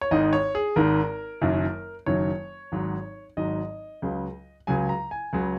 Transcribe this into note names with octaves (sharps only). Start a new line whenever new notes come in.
C#5
G#1 G#2 D#3 D#5
C#5
G#4
G#1 G#2 D#3 A#4
F#1 F#2 D#3 F#3
F#1 F#2 D#3 F#3 C#5
G#1 G#2 F#3
G#1 G#2 F#3 D#5
C#2 C#3 F#3
C#2 C#3 F#3 G#5
A#5
G#5
C#2 C#3 F#3